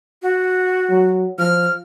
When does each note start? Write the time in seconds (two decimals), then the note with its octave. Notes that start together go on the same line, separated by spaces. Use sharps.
0.22 F#4
0.90 F#3
1.39 F3 F6